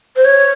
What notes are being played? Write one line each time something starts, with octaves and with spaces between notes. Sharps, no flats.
C5
C#5